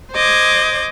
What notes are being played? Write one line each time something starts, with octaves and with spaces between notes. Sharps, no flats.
C5 D#5 D6 G#6